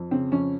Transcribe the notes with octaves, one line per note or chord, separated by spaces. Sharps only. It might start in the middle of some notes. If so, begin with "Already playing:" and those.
Already playing: F2
C#3 C4
F2 C#4